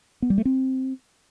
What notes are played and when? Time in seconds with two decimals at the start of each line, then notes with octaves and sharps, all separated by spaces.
0.22 B3
0.30 G3
0.38 A3
0.45 C4